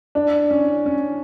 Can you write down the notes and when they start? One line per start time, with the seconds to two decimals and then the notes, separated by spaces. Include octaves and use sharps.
0.15 D4
0.51 C#4
0.86 C#4